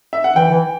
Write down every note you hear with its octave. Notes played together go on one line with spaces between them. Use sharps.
E5
F#5
E3 G5
E3